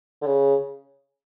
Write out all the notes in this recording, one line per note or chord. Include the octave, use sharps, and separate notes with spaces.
D3
C#3